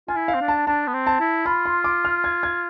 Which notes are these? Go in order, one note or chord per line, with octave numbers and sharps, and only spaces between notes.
F4 G#5
E4
F5
C4
D4
A5
D4 A5
B3
C4
A5
E4
F4 B5
C6
D6
F6
G#6
G#6